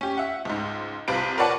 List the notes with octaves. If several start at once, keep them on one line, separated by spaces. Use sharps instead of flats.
C#4 G4
E5 F#5
C#2 G#2
C2 C3 F4 B4 D7
A#4 B4 C#5 D5 F#5 A5